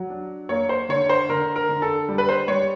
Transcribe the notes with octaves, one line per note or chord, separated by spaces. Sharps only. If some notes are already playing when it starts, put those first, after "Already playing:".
Already playing: F#3 F#5
D4
A#3 C#5
C5
D3 C#5
C5
D3 A#4
A#4
D3
A4
G3
B4
C5
G3 C#5